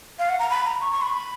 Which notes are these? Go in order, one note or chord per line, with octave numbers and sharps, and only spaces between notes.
F5
F#5
A#5
B5
A#5
C#6
C#6
B5